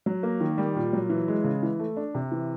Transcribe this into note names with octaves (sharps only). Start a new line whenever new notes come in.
F#3
A#3
D#3
G3
A#2
F#3
E3
G#3
C#3
E3
A3
D4
C3
E3